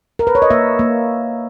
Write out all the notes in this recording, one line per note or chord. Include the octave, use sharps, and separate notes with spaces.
A#4
B4
C#5
D#5
A#3 E5
A#3